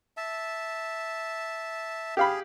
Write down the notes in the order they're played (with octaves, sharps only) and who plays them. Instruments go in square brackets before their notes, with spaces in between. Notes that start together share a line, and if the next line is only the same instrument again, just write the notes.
[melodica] E5 A5
[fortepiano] G4 F5 B5 [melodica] G#4